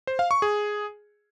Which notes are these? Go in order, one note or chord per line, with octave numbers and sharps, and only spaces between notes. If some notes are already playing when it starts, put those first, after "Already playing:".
C5
F5
C#6
G#4